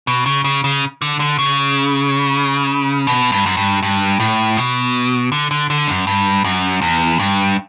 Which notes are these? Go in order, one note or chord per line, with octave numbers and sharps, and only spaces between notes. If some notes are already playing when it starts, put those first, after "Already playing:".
B2
C#3
C#3
C#3
D3
D3
C#3
B2
G2
F#2
G2
G2
A2
B2
D3
D3
D3
F#2
G2
F#2
E2
G2